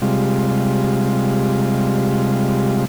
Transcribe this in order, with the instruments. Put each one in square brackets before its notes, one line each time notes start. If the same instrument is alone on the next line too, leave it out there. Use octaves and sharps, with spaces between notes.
[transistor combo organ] C3 G3 G#3 F4